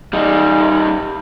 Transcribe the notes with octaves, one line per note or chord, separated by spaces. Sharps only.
G3 D#4